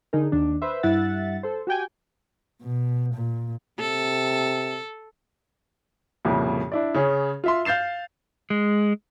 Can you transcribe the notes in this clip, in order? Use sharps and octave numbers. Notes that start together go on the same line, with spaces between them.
D3 D#4 G#4 A#4
D#2 D#3 D4
B4 C5 E5
G2 E4 E5 F#5 A6
A4 C5
F#4 G4 G5 G#5
B2
A#2
C3 A4
C2 F2 A#2 C#3
D4 E4 D5
C#3 C#4 G#4
F4 E5 C6
F5 G6 A6 C7 E7
G#3